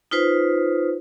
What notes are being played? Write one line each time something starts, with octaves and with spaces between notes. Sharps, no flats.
D#4 F4 B4 C5